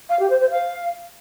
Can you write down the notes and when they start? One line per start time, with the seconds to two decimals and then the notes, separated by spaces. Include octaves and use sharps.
0.09 F5
0.19 G4
0.30 C5
0.40 C5
0.50 F5